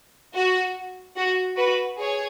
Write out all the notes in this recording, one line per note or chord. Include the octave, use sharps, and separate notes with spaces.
F#4
F#4
F#4 B4
G#4 C#5